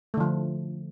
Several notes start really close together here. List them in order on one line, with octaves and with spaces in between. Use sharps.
A3 D3 F3